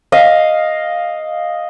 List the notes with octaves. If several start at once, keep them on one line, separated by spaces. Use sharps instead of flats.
D#5 F5